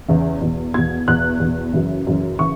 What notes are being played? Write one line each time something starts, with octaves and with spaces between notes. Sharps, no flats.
E2 C#3 E3
E2 B2
E2 B2 G#6
E2 B2 F#6
E2
B2
F#2 C#3 E3
F#2 C#3 E3
C#3 E3 C#6